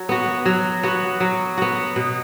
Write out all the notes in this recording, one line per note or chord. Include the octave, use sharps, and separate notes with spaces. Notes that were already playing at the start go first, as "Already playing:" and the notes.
Already playing: F#3
B3 F#4
F#3
B3 F#4
F#3
B3 F#4
B2